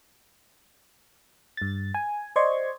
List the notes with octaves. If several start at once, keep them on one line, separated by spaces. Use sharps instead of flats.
G2 A6
G#5
C5 D5 D#5 C6 C#6 G#6